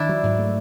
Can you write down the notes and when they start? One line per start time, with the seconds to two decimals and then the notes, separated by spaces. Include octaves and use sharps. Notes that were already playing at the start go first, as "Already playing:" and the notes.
Already playing: D#3 D4 E4
0.09 F#3
0.23 G#2
0.39 A3